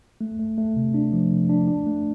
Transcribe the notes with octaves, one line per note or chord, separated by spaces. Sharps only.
A3
A3
A3
C3
D4
F3
C3
D4
D4
A3